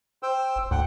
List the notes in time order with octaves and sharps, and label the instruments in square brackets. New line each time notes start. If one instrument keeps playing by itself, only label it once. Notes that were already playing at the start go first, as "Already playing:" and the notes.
[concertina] C5 G5 E6
[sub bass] G1
[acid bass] D2 [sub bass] G#2 [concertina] F#5 G5